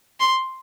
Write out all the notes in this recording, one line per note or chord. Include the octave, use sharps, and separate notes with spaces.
C6